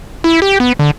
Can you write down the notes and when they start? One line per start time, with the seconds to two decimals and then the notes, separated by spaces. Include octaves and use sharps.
0.24 E4
0.42 G4
0.60 B3
0.79 D3